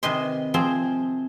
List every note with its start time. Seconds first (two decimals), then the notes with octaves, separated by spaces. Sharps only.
0.03 C3 D#3 B4 D#5 G#5 C6
0.54 F3 C4 G#4